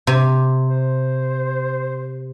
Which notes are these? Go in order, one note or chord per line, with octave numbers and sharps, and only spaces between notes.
C3
C5